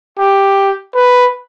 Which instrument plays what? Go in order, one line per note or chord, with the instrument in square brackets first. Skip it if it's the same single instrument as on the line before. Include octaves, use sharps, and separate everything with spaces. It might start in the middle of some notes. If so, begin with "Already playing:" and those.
[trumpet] G4
B4